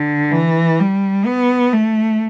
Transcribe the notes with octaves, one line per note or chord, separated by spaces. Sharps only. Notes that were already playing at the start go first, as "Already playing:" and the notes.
Already playing: D3
E3
G3
B3
A3